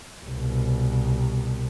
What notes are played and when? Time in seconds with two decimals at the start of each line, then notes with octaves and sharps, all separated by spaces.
0.24 C2 B2